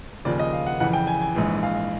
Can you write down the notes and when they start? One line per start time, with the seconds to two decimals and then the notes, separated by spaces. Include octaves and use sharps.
0.25 D#2 C#3 F3 D5
0.39 D#5
0.53 F5
0.66 F#5
0.80 F2 C#3 E3 F#5
0.93 G5
1.07 G#5
1.21 G#5
1.35 A#1 G#2 E3
1.63 F5